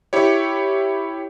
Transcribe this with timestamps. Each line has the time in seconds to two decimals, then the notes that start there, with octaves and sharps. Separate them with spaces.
0.13 E4 G4 C#5